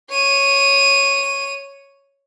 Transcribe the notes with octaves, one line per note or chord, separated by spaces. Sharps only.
C#5 D#7